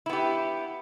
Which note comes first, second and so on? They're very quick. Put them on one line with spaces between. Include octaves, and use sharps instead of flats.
E4 B3 G4